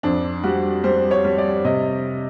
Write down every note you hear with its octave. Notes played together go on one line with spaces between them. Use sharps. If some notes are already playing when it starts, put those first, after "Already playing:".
F2 D4
G3 F#4
G3 C5
C#5
G3
D5
C3 D#5